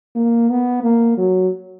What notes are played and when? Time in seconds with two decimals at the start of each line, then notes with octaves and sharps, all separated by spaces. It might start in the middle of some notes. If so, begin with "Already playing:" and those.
0.16 A#3
0.50 B3
0.83 A#3
1.18 F#3